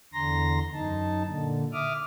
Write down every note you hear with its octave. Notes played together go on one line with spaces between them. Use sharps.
E2 D3 A#5 C6 A#6
F#2 D#4 A5
A#2 D3
E5 D6 D#6 F6